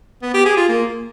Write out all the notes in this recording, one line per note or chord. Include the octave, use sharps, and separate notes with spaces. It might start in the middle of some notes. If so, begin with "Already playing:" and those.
B3
G4
G#4
F4
A#3